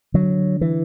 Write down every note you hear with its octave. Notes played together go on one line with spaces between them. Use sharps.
D3 F#3
E3